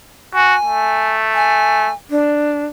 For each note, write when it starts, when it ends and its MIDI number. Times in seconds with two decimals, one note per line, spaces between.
0.34 0.55 66
0.34 1.12 80
0.65 1.89 57
1.34 1.93 80
2.10 2.66 62